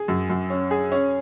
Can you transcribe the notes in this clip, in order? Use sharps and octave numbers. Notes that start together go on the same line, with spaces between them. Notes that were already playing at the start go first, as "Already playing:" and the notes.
Already playing: G#4
F#2
F#2
C#4
G#4
C#4